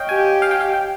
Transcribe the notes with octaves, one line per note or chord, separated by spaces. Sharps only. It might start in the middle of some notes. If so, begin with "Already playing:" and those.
Already playing: C#5 D#5 F5 G5
G4 G#5
F5
G5
F5
G5